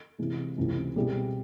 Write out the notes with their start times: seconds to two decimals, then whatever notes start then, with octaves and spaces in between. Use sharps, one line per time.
0.18 C3 E3 G#3
0.58 C#2 C3 E3 A3
0.96 B2 G3 C4 E4 G#4